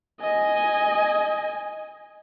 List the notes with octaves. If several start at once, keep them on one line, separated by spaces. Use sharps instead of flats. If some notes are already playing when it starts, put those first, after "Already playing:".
D#5 G#5